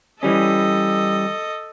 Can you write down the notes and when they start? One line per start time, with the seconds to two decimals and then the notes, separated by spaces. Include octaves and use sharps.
0.23 E3 G3 C#4 A4 D#5